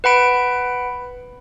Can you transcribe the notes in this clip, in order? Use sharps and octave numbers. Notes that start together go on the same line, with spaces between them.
B4 F#5 B5 D7